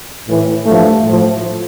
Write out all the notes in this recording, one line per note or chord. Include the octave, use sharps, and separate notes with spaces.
A2 E3
G2 F3 A3
A2 F3